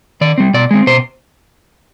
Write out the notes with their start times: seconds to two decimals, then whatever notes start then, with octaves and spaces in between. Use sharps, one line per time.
0.21 D#3 D5
0.38 G3 C4
0.54 B2 D5
0.71 G#3 C4
0.87 B2 C5